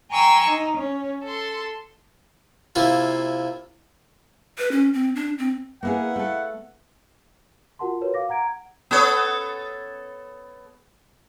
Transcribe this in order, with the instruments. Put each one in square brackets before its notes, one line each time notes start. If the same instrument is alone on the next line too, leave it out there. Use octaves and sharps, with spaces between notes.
[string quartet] G5 G#5 A#5 C6 C#6 E6
D#4
C#4
A4 C6
[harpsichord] C3 A#3 E4 F4
[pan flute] B4
C#4
C4
D4
C4
[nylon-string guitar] A#3 B3 G#4 [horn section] E4 F5 F#5
[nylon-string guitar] A3 A4
[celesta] F4 F#4 A#4 F#5 A5 C6
F#4 A#4 B4 C#5
F5 D6 A#6
F#5 A#5 G#6 D7
[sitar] B3 A4 C#5